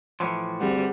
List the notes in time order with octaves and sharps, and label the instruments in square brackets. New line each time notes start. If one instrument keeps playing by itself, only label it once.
[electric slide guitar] A2 E3 F3
[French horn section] D2 G2 C4 [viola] G3 [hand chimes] G#4 F#5